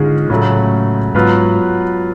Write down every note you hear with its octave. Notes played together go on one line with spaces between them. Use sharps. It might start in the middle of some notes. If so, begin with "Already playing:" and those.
Already playing: G#2 D3 G#3 C#4 F4 G#4
A2 C#3 F#3 A3
G#2 F#3 B3 F4 B4